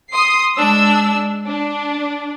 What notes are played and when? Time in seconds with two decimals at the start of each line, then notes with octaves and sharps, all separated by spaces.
0.13 C6 D#6 C7
0.56 G#3 D4 E6
1.46 D4